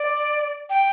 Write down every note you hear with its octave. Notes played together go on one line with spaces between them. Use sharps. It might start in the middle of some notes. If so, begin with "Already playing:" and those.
Already playing: D5
G5